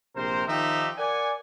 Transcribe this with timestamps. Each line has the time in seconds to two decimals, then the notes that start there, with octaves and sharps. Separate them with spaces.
0.16 A#1 C3 A#4 C5
0.48 D#3 F3 D#4 G4 E5
0.98 A#4 D5 F#5 G#5